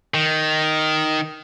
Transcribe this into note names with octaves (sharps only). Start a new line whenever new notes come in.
D#3